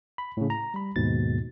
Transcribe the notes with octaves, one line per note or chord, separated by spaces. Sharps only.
B5
A2 C#3
A#5
G3 B5
D#2 G#2 B2 A6